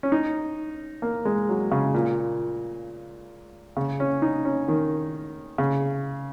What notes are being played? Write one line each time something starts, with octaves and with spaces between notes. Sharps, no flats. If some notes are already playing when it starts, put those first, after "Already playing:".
C#4
D#4
A#3
G#3
F#3
C#3
A#2
C#3
C#4
D#4
C#4
D#3
C#3